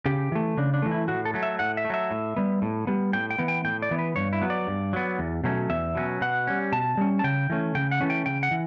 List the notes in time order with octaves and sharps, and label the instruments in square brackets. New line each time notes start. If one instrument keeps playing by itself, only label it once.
[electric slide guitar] C#3 G4
E3 A3
C#3 D4
D4
E3 A3
E4
A2 F#4
A4
F#3 A3
E5
A2 F#5
E5
A3
F#3 E5
A2
G3 B3
A2
G3 B3
A2 G5
G5
E3 B3
G5
A2 G5
D5
E3 B3
B4
G2 C#5
E4
F#3 B3
D5
G2
F#3 B3
E2
B2 F#3 A3 C#4
E2 E5
B2 F#3 A3 C#4
B2 F#5
G3 C#4
B2 A5
G3 C#4
A5
C#3 G5
E3 A3 C#4
C#3 G5
F#5
E3 A3 C#4
G5
C#3 G5
F#5
E3